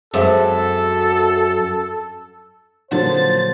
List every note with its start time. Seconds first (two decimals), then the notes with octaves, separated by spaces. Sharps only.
0.14 F#2 G#3 C4 A4 E5
2.92 A#2 D3 F3 F#3 A#3 C5 A6